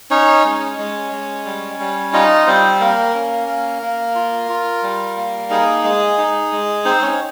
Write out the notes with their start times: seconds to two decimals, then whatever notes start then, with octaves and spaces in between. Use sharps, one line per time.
0.11 C#4 D#4 C#5
0.45 G#3
0.78 G#3
1.12 G#3
1.45 G3
1.80 G3
2.13 D#4 F4 D#5
2.47 G3 C4 C5
2.80 A#3 A#4
3.14 C#4
3.48 A#3
3.82 A#3
4.15 F4
4.49 F4
4.83 G3
5.17 A#3
5.50 D#4 G#4
5.84 G#3
6.18 D#4
6.52 G#3
6.85 C4 D#4 C5
7.02 C#4 C#5